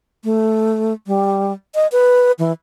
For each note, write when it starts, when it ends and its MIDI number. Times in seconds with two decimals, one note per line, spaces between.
0.24 0.93 57
1.07 1.53 55
1.75 1.87 75
1.92 2.32 71
2.39 2.52 52